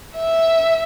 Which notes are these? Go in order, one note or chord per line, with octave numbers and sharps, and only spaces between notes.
E5